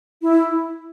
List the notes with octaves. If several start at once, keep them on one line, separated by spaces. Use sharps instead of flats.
E4